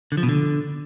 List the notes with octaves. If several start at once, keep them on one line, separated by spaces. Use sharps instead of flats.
D3
F3
B2
D3